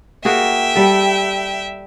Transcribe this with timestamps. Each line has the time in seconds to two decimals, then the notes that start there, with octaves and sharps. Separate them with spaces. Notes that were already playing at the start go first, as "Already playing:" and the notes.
0.25 A#3 F#4 G#4 E5 G5
0.75 G3 A4